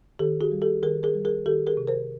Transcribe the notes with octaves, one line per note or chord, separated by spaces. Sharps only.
D#3 G4 A4
F#4 G#4
G3
G4 A4
D#3 G#4 A#4
G#4 A#4
G3
G#4 A#4
D#3 G4 A4
G#4 A#4
C3
A#4 C5